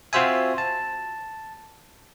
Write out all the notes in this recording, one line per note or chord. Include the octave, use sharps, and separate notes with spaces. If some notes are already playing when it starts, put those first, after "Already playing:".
C4 F4 F#4 C5 E5 G#5
A5